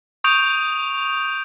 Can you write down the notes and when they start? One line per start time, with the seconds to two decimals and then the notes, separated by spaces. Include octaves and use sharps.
0.24 C#6 D#6 G6 D7 F7